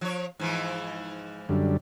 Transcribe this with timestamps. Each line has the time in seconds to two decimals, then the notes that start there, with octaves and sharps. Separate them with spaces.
0.01 F3 C#5
0.40 G#2 E3 F3
1.49 F#2 D3 G3